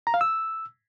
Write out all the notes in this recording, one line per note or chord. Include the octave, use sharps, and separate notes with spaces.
A#5
F5
E6